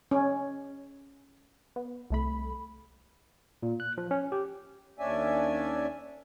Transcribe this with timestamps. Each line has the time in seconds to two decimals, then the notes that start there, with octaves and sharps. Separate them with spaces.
0.11 C#4
1.76 B3
2.10 C2 A3 B5
3.63 A#2
3.80 F#6
3.98 F3
4.11 C#4
4.32 G4
4.99 D#2 C#4 D4 D5 E5 G#5